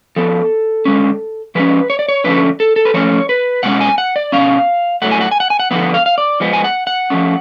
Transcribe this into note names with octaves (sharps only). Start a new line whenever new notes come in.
F3 B3 A4
D3 G#3 C#4
F3 G#3 C#4 B4
C#5
D5
C#5
D3 F3 A3 C#4 B4
A4
A4
B4
F3 A3 C#4 C#5
B4
B2 G#3 C#4 F#5
G#5
F#5
D5
B2 G#3 C#4 F5
A2 F#3 A3 F#5
G#5
F#5
G#5
F#5
G#5
F#5
D3 F3 B3 F#5
F5
F5
D5
F3 G#3 B3
G#5
F#5
F#5
F3 A3 C#4